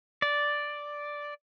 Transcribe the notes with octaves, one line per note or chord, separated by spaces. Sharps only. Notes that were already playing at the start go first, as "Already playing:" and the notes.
D5